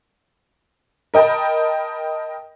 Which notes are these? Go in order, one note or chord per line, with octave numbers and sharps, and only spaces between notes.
A#4 D#5 G5 A5 B5